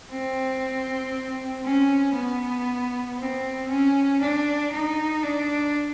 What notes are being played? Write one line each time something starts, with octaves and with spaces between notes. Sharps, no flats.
C4
C#4
B3
C4
C#4
D4
D#4
D4